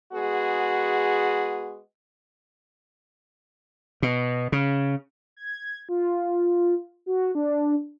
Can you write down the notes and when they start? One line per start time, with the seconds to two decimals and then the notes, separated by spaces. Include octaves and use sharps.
0.13 G#3 B3 F#4 G#4
4.02 B2
4.52 C#3
5.37 G#6
5.89 F4
7.06 F#4
7.35 D4